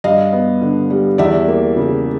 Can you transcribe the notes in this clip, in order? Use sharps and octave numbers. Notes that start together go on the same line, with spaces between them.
G2 D#5 F5
B3
D3
G3
E2 D5 E5
A#3
C#3